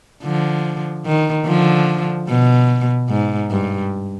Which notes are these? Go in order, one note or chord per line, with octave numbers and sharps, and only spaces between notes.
D3 F3
D#3
D3 F3
B2
G#2
G2